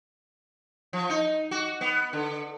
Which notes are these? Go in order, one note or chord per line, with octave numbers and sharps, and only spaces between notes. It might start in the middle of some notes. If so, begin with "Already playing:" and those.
F3
D#4
F#4
B3
D3